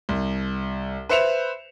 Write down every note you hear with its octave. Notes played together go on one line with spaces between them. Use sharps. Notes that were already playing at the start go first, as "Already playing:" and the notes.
C2
B4 C5 E5 C#7 E7 F7